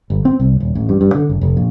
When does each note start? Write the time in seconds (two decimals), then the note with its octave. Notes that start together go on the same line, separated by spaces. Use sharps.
0.10 G1
0.25 C4
0.40 C2
0.60 D#1
0.75 A1
0.89 G2
1.01 G2
1.15 D3
1.29 F#1
1.41 F1
1.57 A#1